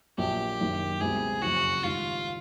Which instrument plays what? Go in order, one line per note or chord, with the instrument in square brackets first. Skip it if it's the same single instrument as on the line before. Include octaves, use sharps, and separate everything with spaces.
[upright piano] A#1 A#2 F#3 A#3 [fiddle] G4
[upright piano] F#1 F#2 D#3 F#3 A#3
[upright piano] C#2 B2 G3 C4 E4 [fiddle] G#4
[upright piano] F#1 F2 C#3 F3 [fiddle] F#4
[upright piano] G#1 G#2 D#3 G3 [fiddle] F4